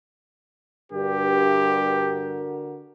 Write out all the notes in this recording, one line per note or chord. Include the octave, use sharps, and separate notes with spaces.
G2 D3 F#4 G4 A#4